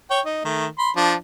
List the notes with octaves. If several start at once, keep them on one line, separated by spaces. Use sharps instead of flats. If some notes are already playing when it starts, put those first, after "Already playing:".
C#5 G5
D#4
D#3 A3
B5 C6
F3 D4